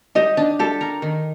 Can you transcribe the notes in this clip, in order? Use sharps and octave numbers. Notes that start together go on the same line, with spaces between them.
D#4 G4 D#5
D4
G4 A4
A#4
D#3